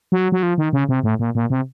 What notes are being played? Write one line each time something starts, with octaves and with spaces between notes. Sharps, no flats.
F#3
F#3
F3
D#3
C#3
C3
A2
A#2
A#2
C3